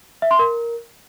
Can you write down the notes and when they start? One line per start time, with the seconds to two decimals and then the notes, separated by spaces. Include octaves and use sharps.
0.22 E5
0.31 C6
0.39 A#4